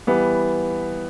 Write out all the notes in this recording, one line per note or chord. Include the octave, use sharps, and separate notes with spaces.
E3 G3 B3